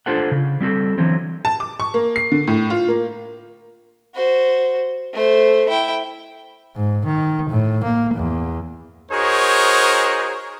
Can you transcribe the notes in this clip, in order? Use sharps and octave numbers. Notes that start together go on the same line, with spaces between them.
D4 F4 A4 C5 F#5
C#3
G3 C4 F#4 A4
D3 E3 F#3 C4
A5
D6
C#6
A#3
C7
D3
A2
F4
A#3
F#4 C5
A3 C5
E4 G5
G#2
D#3
A2
A#3
E2
D#4 F#4 G#4 A#4 C5 C#5